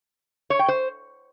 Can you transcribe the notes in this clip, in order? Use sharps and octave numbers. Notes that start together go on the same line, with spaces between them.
C#5
G5
C5